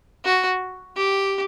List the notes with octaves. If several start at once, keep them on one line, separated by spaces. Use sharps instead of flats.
F#4
G4